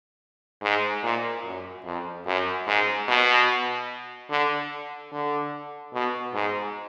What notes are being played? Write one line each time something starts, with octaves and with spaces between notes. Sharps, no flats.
G#2
A#2
F#2
F2
F#2
G#2
B2
D3
D3
B2
G#2